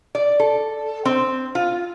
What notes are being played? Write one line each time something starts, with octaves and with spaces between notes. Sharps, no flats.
D5
A4
C4
F4